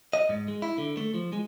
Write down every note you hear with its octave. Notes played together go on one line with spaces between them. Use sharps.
D#5
G#2
G#3
E4
D3
A3
F3
G#3